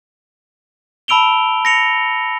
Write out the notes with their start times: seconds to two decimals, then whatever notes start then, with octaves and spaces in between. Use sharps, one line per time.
1.08 A5 B5 E6 D7 F7 G7
1.65 A#6 C#7 F7